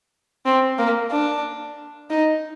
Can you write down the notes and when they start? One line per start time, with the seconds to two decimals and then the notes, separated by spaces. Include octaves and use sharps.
0.46 C4
0.78 A#3
1.11 D4
2.10 D#4